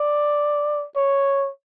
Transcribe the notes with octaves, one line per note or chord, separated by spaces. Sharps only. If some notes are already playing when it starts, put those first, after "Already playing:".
Already playing: D5
C#5